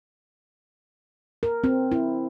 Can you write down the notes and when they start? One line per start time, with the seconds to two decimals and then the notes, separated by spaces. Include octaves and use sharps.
1.43 A#4
1.64 C4
1.92 E4